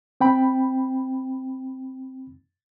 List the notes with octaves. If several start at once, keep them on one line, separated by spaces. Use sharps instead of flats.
C4 G5 B5